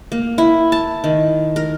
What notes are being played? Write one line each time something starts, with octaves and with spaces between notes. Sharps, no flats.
A#3
E4
A5
D#3
A#4